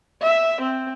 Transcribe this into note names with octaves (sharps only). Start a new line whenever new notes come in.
E5
C4